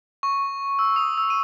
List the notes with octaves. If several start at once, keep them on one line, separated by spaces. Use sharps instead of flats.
C#6
E6
D#6
E6
D#7